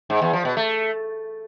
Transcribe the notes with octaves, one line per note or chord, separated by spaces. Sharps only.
G#2
E2
F3
B2
A3